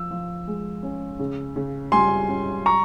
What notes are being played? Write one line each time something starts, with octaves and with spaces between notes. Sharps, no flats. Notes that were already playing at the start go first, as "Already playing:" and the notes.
Already playing: F3 E6
F3
G#3
C#4
C#3
C#3
G3 G#5 C6
C#4
A#5 C#6